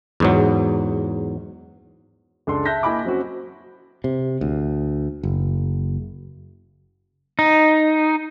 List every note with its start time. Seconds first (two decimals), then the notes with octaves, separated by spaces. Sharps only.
0.20 E2 G#2 F#3
2.47 C#2 D4 A4 C6
2.65 E5 A5 F#6 G6 A#6 B6
2.83 A#3 E4 D#5 G#5 B5 D6
3.05 F#3 C4 C#4 F#4
4.04 C3
4.41 D2
5.23 F#1
7.39 D#4